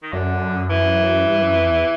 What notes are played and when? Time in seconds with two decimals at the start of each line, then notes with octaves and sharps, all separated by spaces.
0.03 D#3
0.13 F#2 D3
0.70 E3
1.26 G2
1.41 F#2
1.55 F2
1.69 E2